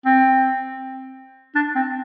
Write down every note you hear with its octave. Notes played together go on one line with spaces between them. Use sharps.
C4
D4
C4